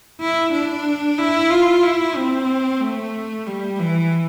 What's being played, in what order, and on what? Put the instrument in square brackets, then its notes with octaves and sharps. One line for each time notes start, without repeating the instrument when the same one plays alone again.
[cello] E4
D4
E4
F4
E4
C4
A3
G3
E3